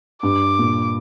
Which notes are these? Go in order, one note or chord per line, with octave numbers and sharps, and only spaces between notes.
G2 D6
A#2